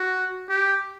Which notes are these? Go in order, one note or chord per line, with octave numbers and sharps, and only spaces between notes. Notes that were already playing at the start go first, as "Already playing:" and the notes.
Already playing: F#4
G4